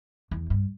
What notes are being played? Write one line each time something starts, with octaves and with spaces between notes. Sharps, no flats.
E2
G2